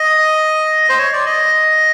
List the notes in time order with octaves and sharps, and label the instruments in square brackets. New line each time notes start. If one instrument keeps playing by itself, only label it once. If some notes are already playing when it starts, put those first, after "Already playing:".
Already playing: [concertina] D#5
C5
C#5
D5
D#5